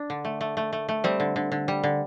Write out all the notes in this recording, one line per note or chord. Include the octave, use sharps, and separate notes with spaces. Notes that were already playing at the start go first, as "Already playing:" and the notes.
Already playing: D4
D3
A3
A3
A3
A3
A3
G3 C4
D3
D3
D3
G3
D3